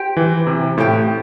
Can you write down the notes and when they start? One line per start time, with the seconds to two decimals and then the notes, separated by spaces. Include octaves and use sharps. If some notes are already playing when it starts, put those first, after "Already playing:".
Already playing: G4 C5 G5
0.17 E3
0.47 C3
0.78 A2 G4 C5 G5